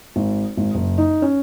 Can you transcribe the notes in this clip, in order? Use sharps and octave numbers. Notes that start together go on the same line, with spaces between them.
G#1
G#1
F#1
D#4
C#4